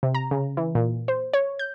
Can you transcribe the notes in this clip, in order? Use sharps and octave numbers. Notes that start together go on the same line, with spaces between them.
C3
A#5
C#3
E3
A#2
C5
C#5
G6